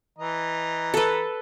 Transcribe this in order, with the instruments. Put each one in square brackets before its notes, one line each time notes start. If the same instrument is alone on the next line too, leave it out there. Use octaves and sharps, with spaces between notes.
[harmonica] E3 D#5 A#5
[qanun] A4 B4